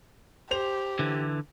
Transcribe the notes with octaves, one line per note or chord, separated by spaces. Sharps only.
G4 C5 F7
D3 E3